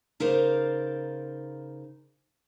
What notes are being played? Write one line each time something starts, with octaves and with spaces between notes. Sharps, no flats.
C#3 D#4 A#4 C5 D5 F5